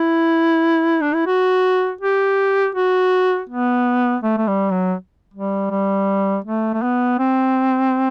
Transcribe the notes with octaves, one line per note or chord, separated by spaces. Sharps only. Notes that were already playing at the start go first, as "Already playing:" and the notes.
Already playing: E4
D4
E4
F#4
G4
F#4
B3
A3
A3
G3
F#3
G3
G3
A3
A3
B3
C4